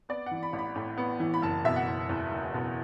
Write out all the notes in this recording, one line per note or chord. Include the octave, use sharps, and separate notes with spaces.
B3 D5
F#5
E3
B5
A1
B5
A2
B3
E3
B5
F#1 A5
B2 E5
F#5
F#1
E2
F#1
B2